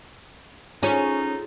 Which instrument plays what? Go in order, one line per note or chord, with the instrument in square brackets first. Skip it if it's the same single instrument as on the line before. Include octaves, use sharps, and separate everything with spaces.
[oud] C#4 [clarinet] D#4 [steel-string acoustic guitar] F4 G#4 A4